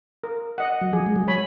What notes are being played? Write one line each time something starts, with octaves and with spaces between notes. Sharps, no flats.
A#4
D#5 F#5
F#3
F3 G#4
G#3
F#3
C#5 G#5 B5